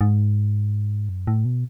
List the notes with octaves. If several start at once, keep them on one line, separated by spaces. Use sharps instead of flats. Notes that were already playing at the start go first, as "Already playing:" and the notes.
G#2
F#2
A2
B2